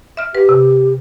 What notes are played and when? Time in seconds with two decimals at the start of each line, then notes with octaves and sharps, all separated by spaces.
0.17 E5 F6
0.35 G4 B4
0.49 C3